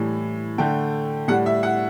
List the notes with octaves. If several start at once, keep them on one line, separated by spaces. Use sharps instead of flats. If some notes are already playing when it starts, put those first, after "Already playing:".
Already playing: A2 E3 G3
D3 A3 G5
A2 G3 F#5
E5
F#5